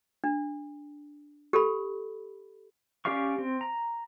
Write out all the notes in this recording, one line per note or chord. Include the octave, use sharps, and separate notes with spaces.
D4
G4 A4 B5
C#4 G4 D5 F5 C#6
C4
A#5